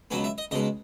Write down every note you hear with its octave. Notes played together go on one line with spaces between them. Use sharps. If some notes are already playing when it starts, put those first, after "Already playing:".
C#2 B2 F#3 B3 G#5
E5
D#5
C#2 B2 G#3 D#5